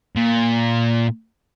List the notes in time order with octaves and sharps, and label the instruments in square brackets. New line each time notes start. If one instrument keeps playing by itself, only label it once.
[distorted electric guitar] A#2